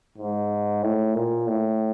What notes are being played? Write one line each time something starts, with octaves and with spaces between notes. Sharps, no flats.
G#2
A2
A#2
A2